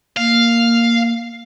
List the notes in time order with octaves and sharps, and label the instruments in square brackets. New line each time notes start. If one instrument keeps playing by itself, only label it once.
[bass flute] A#3 [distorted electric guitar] F5